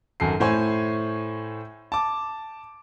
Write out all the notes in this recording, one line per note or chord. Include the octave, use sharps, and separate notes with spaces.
G#1 F#2 A4 C7
A2 C5 C#5 G#5
A5 D6